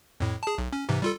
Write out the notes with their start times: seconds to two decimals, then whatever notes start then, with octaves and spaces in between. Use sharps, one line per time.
0.20 F2 A2
0.43 G#4 A5
0.58 B1
0.73 C#4
0.89 G#2 C3 E3
1.02 G3 F4 A4